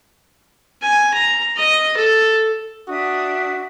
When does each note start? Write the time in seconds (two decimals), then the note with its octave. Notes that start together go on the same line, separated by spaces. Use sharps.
0.82 G#5
1.14 A#5
1.57 D#5
1.97 A4
2.88 D4 F#4 E5 D#6